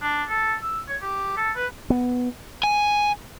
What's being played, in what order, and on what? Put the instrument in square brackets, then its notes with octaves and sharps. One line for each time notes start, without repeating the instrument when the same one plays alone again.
[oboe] D4
A4
E6
C#5
G4
A4
B4
[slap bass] B3
[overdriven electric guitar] G#5